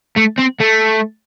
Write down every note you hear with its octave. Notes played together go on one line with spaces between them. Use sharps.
A3
C4
A3